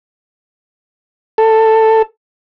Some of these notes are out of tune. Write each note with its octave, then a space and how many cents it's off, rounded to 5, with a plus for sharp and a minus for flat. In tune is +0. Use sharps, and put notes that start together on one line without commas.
A4 +10